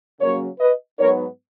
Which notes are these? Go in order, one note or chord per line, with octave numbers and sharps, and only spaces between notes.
C#3 F#3 A#3 C#4 A#4 C#5
B4 D#5
G#2 F#3 B3 D#4 A#4 C#5